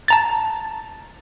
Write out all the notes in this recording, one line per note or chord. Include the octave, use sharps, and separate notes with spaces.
A5 A#5 A6